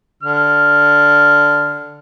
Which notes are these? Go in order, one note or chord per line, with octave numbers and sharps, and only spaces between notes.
D3 F6